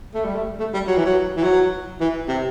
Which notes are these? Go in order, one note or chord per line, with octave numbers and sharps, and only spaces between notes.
A3
G3
A3
A3
G3
F#3
E3
F#3
E3
F#3
E3
C3